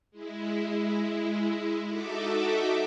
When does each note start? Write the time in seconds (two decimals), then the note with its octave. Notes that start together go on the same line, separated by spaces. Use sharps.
0.11 G#3 E4
1.86 D#4 F#4 A4 E5 D6